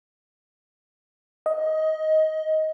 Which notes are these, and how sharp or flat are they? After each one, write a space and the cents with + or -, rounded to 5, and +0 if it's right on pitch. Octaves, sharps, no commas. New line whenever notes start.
D#5 +10